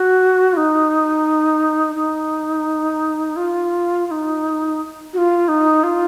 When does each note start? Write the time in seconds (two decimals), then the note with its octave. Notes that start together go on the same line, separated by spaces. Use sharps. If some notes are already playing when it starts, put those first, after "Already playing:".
Already playing: F#4
0.53 F4
0.57 D#4
1.95 D#4
3.36 F4
4.06 F4
4.11 D#4
5.13 F#4
5.18 F4
5.48 D#4
5.84 F4